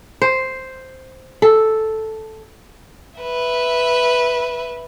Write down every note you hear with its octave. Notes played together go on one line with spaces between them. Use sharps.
C5
A4
B4 E5